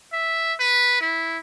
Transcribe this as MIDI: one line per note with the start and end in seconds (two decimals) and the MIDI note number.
0.12 0.54 76
0.60 0.97 71
1.01 1.38 64